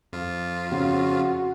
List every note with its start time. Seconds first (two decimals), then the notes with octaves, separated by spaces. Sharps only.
0.13 F2 F4
0.72 C#3 F#4